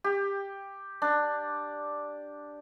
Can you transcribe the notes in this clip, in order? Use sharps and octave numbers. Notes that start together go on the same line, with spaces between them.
G4
D4